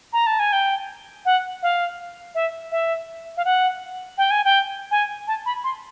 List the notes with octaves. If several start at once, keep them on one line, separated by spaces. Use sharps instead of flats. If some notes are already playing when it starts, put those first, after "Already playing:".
A#5
A5
G#5
G5
F#5
F5
E5
E5
F5
F#5
G5
G#5
G5
G#5
A5
B5
C6